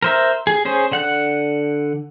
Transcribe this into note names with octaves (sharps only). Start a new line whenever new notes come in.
A#4 C5 E5
G#4
C#4 G#4 C5
D3 F#5 F#6